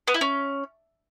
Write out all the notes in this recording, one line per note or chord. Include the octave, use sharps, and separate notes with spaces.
B3
E4
C#4